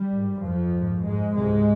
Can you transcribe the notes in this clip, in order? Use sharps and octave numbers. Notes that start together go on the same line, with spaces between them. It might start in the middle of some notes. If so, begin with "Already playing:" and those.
Already playing: G3
G#1 G2
F2 F3
A#1 G#2
G#2 G#3
C#2 G#2 C3 G#3